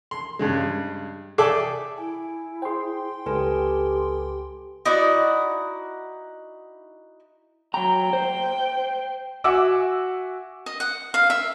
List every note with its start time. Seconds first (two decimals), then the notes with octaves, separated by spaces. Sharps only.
0.11 C6
0.39 G2 C#3 G#3
1.38 G#4 A4 D5 E5 G5 D6
1.98 E4 G#5
2.62 G#4 C5 G5 C6
3.26 C#2 G4 A4 B4 G#5
4.85 D#4 E4 F#4 D5
7.74 F#3 G5 A#5
8.13 C5
9.44 F#4 E5 F#5 G#5 D6 E6
10.66 D#5
10.80 F#5
11.14 F5
11.30 E5